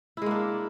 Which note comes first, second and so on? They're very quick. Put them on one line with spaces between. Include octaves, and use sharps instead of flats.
E4 G#3 A#3 D4